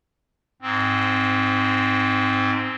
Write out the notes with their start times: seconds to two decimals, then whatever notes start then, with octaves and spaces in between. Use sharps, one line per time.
0.62 G#2 C4